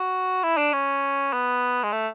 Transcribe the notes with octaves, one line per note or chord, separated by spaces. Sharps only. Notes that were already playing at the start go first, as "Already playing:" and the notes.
Already playing: F#4
E4
D4
C#4
B3
G#3
A3